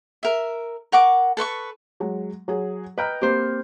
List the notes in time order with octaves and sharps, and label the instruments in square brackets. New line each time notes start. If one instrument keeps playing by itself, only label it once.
[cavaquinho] A#4 E5
A#4 F#5 C#6 D6
A4 B4 C6 C#6
[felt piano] F#3 G#3
F#3 G#4
[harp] B4 G5 [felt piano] D#5 A#5 F6
[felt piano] A#3 C4 [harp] G4 C5